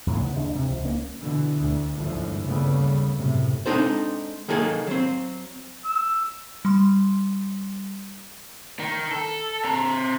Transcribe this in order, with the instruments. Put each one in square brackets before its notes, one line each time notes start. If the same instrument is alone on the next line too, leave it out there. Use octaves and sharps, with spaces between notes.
[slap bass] E2 A2 F#3 A#3
C#3 B3
D#2 G#3 D4
C3
C#2 F3
A#3 C#4
[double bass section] B2 D3 E3
D2
G1 D#2 G#2 D3 E3 F3
D#2 C#3 G3 A3 B3
F#2 A2 C3
[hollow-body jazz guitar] G#3 C4 D4 D#4 A4 C5
D#3 F#3 A#3 D#4 G#4 A4
F#3 C4
[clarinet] E6
[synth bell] G3 C6
[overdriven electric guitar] D#3
A4
C4 A#5